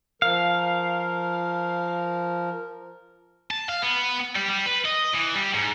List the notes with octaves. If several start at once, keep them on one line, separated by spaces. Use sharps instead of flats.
F3 A#4 F5
A5
F5
B3
G3
G3
B4
D#5
E3
G3
G#2